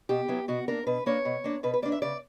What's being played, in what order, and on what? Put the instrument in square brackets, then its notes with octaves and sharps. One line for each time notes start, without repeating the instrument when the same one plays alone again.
[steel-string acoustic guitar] B2 G4
F#3 B3 E4
B2 F#4
A#3 D4 A#4
B2 B4
A#3 D4 C#5
B2
A#3 D4
B2 B4
B4
A#3 D4 D5
E5
C#3 D5